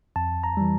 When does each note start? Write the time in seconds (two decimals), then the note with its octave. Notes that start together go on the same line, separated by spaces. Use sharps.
0.16 F2 A5
0.44 A#5
0.57 E3 G3